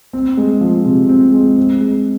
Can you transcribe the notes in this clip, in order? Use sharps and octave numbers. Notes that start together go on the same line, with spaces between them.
C4
G#3
F3
C3
C4
G#3
C4
G#3